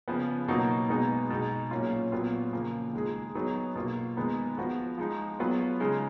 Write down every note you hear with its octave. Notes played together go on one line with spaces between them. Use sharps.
C#3 F3 B3
B2 F#3 A#3 D#4 F#4
B2 G#3 B3 D#4 G#4
B2 G#3 D#4
A#2 F#3 A#3 C#4 F4
A#2 F#3 B3 F4
C#3 F3 A#3
D#3 G#3 D#4 G#4
F#3 B3 D#4 G#4
B2 A#3 F4
D#3 G#3 B3 D#4
F3 B3 F#4
F3 G#3 D#4
F#3 B3 F4
C#3 G#3 D#4 G#4